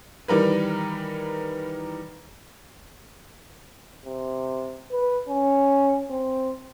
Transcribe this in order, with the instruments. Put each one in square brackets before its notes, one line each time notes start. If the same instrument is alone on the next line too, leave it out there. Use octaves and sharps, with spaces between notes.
[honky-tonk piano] D#3 E3 G3 A#4 B4
[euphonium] C3
B4
C#4
C4